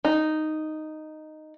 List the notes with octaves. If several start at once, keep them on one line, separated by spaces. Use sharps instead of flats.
D#4